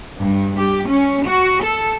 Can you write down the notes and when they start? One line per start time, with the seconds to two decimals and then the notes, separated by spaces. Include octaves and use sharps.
0.18 G2
0.58 G4
0.86 C#4
1.24 F#4
1.61 A4